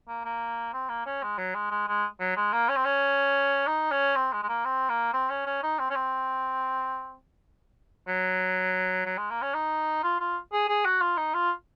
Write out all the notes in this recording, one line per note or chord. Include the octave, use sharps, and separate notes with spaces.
A#3
A#3
C4
A#3
C#4
G#3
F#3
G#3
G#3
G#3
F#3
G#3
A#3
C#4
C4
C#4
D#4
C#4
C4
G#3
G#3
A#3
C4
A#3
C4
C#4
C#4
D#4
C4
C#4
C4
F#3
F#3
G#3
A#3
C#4
D#4
F4
F4
G#4
G#4
F#4
F4
D#4
F4